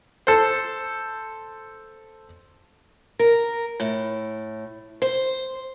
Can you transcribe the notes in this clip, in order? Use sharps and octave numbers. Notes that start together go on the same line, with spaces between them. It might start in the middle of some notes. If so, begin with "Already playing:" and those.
A4 C5
A#4
A2
C5